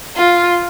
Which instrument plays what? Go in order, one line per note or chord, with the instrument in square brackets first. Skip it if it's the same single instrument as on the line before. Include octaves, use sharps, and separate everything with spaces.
[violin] F4